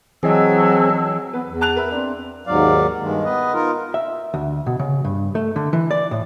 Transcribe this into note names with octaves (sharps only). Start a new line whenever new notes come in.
E3 F#3 C4 G#4 D#5 A5 E6
B3 B4
E2
A5 F#6 F7
A#4 B4 E5
C4 D4
D#2 G#2 F#3 D5 F5
G2 D#3 G#3
B3 B4 D#5
D#4 F4 A#4
E5
D2
B2
C#3
G2
A3
D3
E3
D5
A2